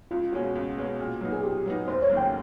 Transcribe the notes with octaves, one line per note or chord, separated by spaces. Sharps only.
C#2 F4
B2 G#3 C#4 F#4
C#2
B2 G#3 C#4
A#2
F#3 B3 D#4
G#4
A#2 G4
F#3 B3 D#4
F1 C5
C#5
D#2 C#3 F#3 A#3
G5